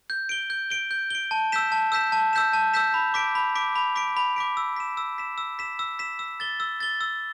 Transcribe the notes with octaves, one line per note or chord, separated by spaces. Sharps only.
G6
D7 G7
G6
D7 G7
G6
D7 G7
A5
E6 G6 B6 E7
A5
E6 G6 B6 E7
A5
E6 G6 B6 E7
A5
E6 G6 B6 E7
B5
D6 B6 D7
B5
D6 B6 D7
B5
D6 B6 D7
B5
D6 B6 D7
E6
B6 E7
E6
B6 E7
E6
B6 E7
E6
B6 E7
E6
A6 G7
E6
A6 G7
E6